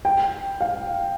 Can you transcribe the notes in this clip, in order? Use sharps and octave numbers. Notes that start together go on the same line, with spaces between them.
G5
F5